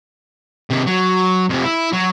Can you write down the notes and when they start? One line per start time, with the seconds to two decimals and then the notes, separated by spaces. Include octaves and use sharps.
0.70 C3 D#3
0.86 F#3
1.49 F2 C3
1.64 E4
1.93 F#3